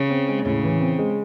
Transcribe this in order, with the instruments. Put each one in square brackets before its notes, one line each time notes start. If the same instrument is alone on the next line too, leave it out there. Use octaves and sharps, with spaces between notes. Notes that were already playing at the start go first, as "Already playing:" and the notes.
Already playing: [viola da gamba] C#3
[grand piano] C4
G#3
[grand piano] A2 [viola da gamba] C#3
[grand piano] E3
C4
G#3